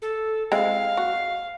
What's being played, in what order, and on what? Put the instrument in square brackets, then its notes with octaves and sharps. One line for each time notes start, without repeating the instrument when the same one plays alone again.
[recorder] A4
[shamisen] G#3 C4 E4 [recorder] F5
[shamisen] F#4